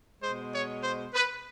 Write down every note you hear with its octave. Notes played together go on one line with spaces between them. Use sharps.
B2 G#3 C5
C#5
C5
B4